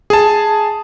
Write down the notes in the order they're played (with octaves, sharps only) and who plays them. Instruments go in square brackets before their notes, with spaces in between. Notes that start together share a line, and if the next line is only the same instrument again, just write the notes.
[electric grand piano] G#4 A5